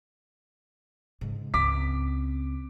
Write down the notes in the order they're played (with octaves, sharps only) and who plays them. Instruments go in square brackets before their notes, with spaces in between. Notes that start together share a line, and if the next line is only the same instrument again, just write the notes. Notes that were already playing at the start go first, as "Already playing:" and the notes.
[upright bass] G#2 C#3
[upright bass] C#2 C4 [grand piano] D6 B6